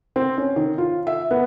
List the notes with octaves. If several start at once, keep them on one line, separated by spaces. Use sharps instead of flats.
C4
C#4
D#3
F4
E5
B3